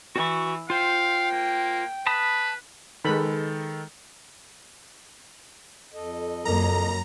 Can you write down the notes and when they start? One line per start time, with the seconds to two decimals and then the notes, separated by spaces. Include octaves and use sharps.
0.16 E3 F#4 C#6
0.70 F4 C5 F5 G5
1.31 A#3
2.07 B4 A5 B5 D#6
3.04 D#3 G#3 A4 B4 B5
5.94 F2 A4 D#5
6.45 F#1 F#2 A#3 A#4 A#5